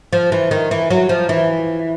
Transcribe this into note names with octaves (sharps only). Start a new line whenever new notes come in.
F3
E3
D#3
E3
F#3
F3
E3